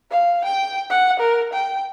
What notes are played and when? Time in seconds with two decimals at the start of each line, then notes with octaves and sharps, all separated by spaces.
0.10 F5
0.44 G5
0.90 F#5
1.19 A#4
1.53 G5